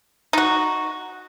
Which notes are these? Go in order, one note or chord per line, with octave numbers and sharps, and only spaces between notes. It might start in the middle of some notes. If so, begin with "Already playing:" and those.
D#4 F#4